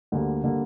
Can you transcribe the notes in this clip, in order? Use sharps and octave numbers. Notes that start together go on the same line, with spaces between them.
D2 D3 G3 A#3
D3 G3 A#3